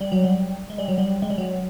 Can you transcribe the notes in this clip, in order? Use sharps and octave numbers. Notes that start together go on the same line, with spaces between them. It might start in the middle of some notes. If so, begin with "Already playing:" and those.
G3
F#3
G3
G#3
G3
F#3
G3
G#3
G3
F#3